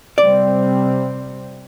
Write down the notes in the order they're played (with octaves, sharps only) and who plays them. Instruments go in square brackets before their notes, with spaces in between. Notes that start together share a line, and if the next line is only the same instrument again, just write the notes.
[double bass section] C3 G3 C4 [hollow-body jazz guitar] D5